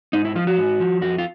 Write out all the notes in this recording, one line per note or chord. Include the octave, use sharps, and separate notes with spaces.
G#2 D#4
E4
F3 F4
F#4
G#2
F3
F2 F#4
F4